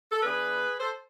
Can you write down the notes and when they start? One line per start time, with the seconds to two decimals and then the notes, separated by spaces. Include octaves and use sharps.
0.12 A4
0.22 E3 B3 D4 G#4 B4
0.80 A4 C5